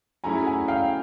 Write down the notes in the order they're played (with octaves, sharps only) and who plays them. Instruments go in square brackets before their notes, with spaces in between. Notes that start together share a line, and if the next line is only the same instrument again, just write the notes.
[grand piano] F#3 A3 C#4 E4 G#4 [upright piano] G#5 A#5
[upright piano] F#5 G#5
F5 G5